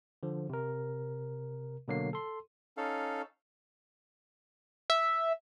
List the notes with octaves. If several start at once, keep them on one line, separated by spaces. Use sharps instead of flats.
D3 F3
C3 A#4
B2 D3 F#3 A#3 C7
A4 C6
C#4 D#4 A4 F5
E5